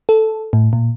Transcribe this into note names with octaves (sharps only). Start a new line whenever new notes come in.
A4
A2
A#2